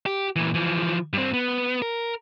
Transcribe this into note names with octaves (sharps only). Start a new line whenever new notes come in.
G4
A#2 E3
E3 F3
G2 C4
B3
A#4